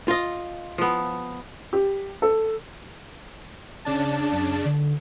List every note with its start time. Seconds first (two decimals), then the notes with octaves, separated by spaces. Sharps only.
0.08 F4 D#5
0.78 F3 B3
1.73 G4
2.22 A4
3.85 C#3 D4 A5
4.32 F#2
4.65 D3